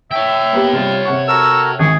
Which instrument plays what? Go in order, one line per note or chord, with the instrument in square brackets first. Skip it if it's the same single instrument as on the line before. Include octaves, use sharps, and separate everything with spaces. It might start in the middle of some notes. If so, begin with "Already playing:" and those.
[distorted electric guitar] C#5 G5 [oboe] E5
[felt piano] A#3 B3 G4
[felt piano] C3 G3 [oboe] F4
[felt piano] C3 F#5 C#6
[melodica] F#4 A4 A#4 [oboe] E6
[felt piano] G#1 [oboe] G#4 [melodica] C#6